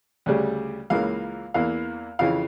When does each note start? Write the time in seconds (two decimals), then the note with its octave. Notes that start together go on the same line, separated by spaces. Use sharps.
0.26 D2 C#3 G3
0.90 C#2 C#3 E3 A#3 F5
1.54 E2 E3 A#3 F5
2.19 F2 C#3 E3 F5